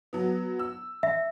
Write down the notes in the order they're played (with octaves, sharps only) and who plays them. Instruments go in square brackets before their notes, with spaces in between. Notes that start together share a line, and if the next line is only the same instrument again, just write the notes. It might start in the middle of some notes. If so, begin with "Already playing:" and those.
[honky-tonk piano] F#3 B3
E6
[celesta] E5